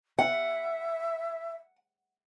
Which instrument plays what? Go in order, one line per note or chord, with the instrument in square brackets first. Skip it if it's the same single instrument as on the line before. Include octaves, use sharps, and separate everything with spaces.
[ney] E5 [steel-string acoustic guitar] F#5